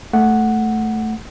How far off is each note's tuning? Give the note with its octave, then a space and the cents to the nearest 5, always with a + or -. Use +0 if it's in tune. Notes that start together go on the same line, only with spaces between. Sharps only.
A3 +0 F#5 +0